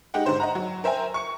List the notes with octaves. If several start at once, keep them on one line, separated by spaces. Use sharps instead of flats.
G#3 D#4 G4 F#5 G5
G#2 D3 C5 C6
D#5 F#5 A#5
F#3
A#4 C5 E5 G5 G#5
C#6 C#7